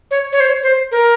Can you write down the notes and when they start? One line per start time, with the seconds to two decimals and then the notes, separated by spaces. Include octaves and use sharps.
0.11 C#5
0.32 C#5
0.40 C5
0.47 C#5
0.63 C5
0.91 A#4